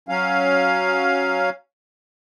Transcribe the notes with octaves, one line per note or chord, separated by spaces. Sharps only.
F#3 C#4 F5